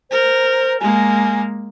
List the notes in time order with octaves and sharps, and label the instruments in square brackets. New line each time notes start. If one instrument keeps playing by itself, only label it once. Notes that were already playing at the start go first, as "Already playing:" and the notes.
[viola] A#4 [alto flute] C5
[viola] G#3 A#3 [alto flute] G#5